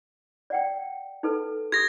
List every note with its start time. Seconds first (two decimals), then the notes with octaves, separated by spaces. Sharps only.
0.50 D5 F#5 G5
1.23 D#4 A4 B4
1.72 G4 D#6 G#6 A#6